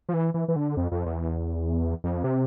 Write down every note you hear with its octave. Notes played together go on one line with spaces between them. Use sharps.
F3
E3
E3
E3
D3
F2
F2
E2
F2
C3